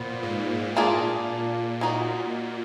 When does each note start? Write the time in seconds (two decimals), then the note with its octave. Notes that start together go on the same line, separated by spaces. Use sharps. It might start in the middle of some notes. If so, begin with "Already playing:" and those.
Already playing: A#2 F3 B3
0.23 G#2
0.75 A#2 A#3 D4 F4 G#4
1.81 G#3 D#4 F#4